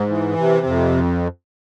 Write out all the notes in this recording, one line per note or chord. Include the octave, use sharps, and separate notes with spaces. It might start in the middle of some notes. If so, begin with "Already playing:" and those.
Already playing: G#2
E3
C3
F2